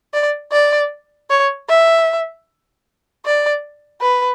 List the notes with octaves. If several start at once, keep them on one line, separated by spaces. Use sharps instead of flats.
D5
D5
C#5
E5
D5
B4